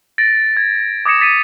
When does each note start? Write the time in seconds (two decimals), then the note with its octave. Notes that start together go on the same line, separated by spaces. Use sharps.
0.18 A6 A#6 D7
0.57 G#6
1.06 D6 D#6 G#6 A#6 C#7 E7
1.21 A6 B6 C#7 D#7